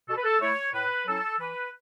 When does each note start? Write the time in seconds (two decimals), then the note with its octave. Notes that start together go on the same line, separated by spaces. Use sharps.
0.09 B2 A4
0.17 B4
0.24 A4
0.41 A3 E4 C#5
0.74 A2 B4
1.07 F#3 C#4 E4 A4
1.39 E3 B4